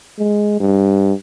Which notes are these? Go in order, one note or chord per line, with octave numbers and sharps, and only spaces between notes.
G#3
G2